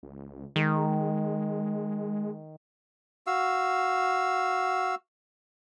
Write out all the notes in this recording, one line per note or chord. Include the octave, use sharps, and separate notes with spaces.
C#2
D#3 G#3
F#4 F5 E6